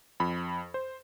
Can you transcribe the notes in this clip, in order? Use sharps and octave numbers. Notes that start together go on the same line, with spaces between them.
F2 B5
C5